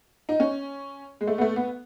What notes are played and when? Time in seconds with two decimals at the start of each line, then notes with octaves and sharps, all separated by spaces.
0.29 D#4
0.40 C#4
1.21 G#3
1.27 A3
1.38 B3
1.41 A3
1.56 B3